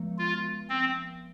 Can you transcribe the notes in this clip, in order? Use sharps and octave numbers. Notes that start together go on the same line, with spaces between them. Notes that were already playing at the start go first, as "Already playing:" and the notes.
Already playing: F3 G#3 B3
F4
C4